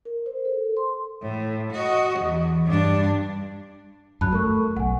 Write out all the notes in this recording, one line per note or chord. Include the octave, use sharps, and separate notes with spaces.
A#4
C5
A4
C6
A2
F#4 D#5
E2
G2 D4
F#2 F#3 A5 B5 F#6
A3 A#4 C#6
B1 F#5 G#5